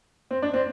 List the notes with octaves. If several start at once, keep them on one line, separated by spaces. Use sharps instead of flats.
C4
D4
C4